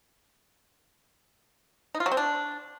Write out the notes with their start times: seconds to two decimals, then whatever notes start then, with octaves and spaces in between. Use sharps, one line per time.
1.95 D#4
2.00 F4
2.06 F#3
2.12 C4
2.17 D4